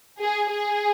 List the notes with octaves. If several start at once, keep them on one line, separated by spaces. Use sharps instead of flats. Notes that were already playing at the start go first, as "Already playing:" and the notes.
G#4
G#4